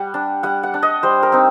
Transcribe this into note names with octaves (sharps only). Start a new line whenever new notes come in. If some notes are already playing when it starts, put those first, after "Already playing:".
Already playing: G3 F#5
D4
G3 F#5
F#5
D4
D#5
G3 C5
A#4
C4 D#4